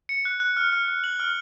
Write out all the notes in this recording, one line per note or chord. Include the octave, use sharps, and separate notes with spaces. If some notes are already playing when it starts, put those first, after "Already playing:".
C#7
F#6
F#6
F6
F6
F6
F#7
F6